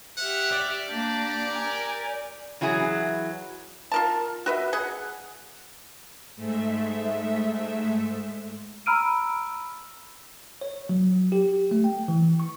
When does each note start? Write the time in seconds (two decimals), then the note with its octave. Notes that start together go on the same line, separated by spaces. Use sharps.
0.17 G4 E5 F#5 F6
0.52 D5
0.90 A#3 D4 G4
1.49 A#4 G#5
2.61 E3 F#3 E4 G#4
3.92 F4 A#4 A5
4.46 F#4 B4 E5
4.73 G#4 F#5
6.36 G#2 G#3 A3 E5
8.86 A#5 B5 E6 F6 D7 D#7
10.61 C#5
10.89 F#3
11.32 G4
11.71 A3
11.84 G5
12.08 E3
12.40 C#6